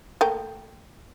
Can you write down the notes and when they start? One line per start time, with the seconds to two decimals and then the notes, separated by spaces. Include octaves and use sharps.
0.21 A3 A#3 G5